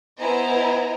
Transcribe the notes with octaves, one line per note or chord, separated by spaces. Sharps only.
B3 E4 C5 D#5 G#5 A#5